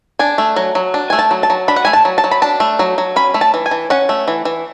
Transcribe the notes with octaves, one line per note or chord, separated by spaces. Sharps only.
D4 G#5
A3
F#3
F#3
D4
A3 G#5
A5
F#3
A5
F#3
D4 B5
F#5
A3 G#5
A5
F#3
A5
F#3
B5
D4 A5
A3
F#3
F#3
C#4 B5
A3
A5
E3
G#5
E3
C#4 F#5
A3
E3
E3